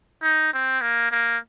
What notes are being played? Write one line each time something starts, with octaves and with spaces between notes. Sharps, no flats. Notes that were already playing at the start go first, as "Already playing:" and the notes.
D#4
C4
A#3
A#3